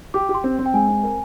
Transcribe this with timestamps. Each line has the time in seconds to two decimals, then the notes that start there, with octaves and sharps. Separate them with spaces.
0.14 G4 D6
0.29 G4
0.34 C6
0.44 C4
0.59 C4
0.66 G5
0.74 G#3 G#5
0.88 C4
1.03 A#4